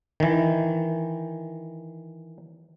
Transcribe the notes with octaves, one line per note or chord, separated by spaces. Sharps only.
D#3 E3